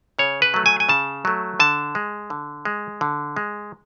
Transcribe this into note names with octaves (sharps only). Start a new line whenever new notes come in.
C#3 C#5
B4
F#3 A3
G#5
G#5
C#3 A5
F#3 A3
D3 A5
G#3
D3
G#3
D3
G#3